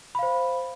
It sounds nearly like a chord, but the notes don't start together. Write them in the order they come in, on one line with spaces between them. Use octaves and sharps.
B5 F5 C5